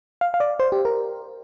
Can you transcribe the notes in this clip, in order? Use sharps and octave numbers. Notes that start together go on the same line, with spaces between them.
F5
F5
D5
C5
G4
A#4